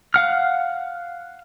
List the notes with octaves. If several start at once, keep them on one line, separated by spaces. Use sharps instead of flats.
F5 F#5 F6